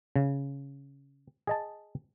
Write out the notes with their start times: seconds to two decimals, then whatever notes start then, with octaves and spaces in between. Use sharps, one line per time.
0.16 C#3
1.47 G#4 D#5 A5